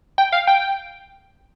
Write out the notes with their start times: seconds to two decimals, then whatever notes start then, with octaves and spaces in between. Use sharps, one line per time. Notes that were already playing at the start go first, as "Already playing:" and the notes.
0.18 G5
0.32 F5
0.47 G5